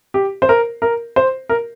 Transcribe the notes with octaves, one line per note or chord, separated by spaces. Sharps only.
G4
C5
A#4
A#4
C5
A#4